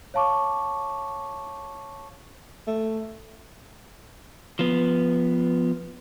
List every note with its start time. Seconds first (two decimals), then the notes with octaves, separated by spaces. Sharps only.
0.14 C#5 F5 A5 C#6 D6
2.67 A3
4.59 F3 B3